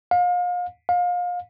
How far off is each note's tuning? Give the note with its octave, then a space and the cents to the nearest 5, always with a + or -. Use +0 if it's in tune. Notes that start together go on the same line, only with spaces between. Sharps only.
F5 +35
F5 +30